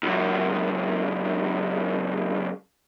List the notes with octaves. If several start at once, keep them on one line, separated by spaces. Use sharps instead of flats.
C#2 F#2